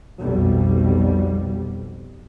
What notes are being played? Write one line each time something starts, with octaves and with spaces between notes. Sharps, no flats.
B1 F2 B2 G3